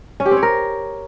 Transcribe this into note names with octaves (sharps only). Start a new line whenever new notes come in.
C#4
G4
C4
C#5
A#4